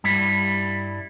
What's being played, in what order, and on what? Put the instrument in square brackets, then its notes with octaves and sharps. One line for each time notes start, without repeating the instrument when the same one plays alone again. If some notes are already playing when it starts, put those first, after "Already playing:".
[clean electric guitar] G2 G3 E4